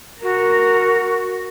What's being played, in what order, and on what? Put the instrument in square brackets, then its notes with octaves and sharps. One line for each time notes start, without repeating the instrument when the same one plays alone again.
[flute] F#4 [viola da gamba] A#4